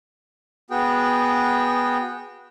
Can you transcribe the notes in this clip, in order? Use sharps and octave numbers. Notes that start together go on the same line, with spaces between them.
B3 F#4 G#4 G5